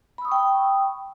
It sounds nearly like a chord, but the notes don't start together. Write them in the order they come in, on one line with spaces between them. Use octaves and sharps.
B5 E6 D#6 C#6 G5